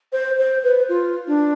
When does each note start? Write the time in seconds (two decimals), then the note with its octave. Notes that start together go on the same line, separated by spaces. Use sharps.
0.13 C5
0.39 C5
0.64 B4
0.89 F4
1.27 D4